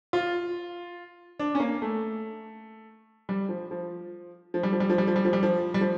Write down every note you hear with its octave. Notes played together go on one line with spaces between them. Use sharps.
F4
D4
C#4
A#3
A3
G3
F3
F3
F3
G3
F3
G3
F3
G3
F3
G3
F3
G3
F3
G3
F3